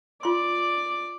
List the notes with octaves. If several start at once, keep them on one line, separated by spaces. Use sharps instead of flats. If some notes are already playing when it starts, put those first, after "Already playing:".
F4 D5 C6